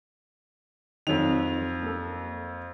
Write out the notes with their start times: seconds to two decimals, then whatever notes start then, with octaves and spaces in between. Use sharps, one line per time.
1.07 F2 D#3 F#3 A4 F7
1.82 A#3 A4